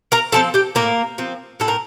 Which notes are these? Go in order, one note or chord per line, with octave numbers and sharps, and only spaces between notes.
A#4 A#5
F3 C4 A4 A5
G4 G5
A2 A#3 A#4
F3 C4
A2 A4
A#4